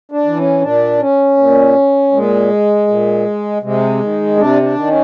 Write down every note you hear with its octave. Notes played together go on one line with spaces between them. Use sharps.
D4
E3
C#4
A#2 D4
C#4
A#2
A#2 G#3
A#2
C3 G#3
D#3
C3 D4
D4
D#3
C#4